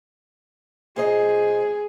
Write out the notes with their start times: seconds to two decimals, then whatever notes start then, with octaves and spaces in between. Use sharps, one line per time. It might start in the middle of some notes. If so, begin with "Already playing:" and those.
0.96 A#2 G#4 C5 D#5